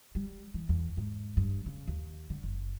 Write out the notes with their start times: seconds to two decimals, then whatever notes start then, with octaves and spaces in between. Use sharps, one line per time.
0.15 G3
0.54 E3
0.69 E2
0.97 G#2
1.37 G2
1.66 C#3
1.88 D#2
2.30 D3
2.44 F#1